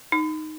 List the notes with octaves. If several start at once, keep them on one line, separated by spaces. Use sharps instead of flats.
D#4